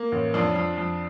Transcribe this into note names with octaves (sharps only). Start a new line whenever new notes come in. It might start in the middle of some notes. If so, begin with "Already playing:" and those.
Already playing: A#3
A1
F2 D4
F2
F2